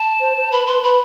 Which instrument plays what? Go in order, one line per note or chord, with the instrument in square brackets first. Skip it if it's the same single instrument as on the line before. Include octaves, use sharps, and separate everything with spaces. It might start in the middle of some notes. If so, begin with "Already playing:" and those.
Already playing: [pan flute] A5
[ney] C5
C5
[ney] B4 [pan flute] B5
[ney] B4 [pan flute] C6
[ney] B4 [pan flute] B5